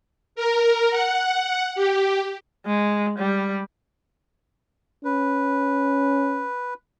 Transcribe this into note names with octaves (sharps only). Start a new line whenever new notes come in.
A#4
F#5
G4
G#3
G3
C#4 B4